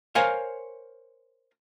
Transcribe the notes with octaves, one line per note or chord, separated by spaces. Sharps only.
A#4 C5 C#5 F5 G#5